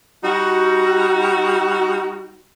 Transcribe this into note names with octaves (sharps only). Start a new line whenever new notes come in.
G3 D#4 F#4